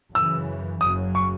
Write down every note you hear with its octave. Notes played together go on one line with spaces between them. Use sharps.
F#2 C#3 E3 E6
F#1 F#2 C#3 F#3 D#6
C#6